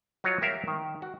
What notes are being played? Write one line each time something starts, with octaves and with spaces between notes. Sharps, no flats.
F#3 F4 F#4 C#5 D#5
G4 G#4 A#4 E5 F5
D#3
F#4